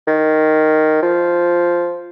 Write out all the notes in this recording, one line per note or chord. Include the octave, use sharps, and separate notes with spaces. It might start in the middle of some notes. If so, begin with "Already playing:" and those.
D#3
F3